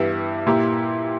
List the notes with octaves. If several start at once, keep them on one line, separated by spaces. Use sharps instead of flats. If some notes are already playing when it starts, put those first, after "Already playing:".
Already playing: G2 E3 B3 E4 G4
A#2 A#3 E4 G4